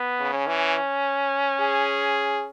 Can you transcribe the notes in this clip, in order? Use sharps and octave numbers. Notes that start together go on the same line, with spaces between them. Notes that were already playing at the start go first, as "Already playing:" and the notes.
Already playing: B3
C#3
C#4
E3
G#4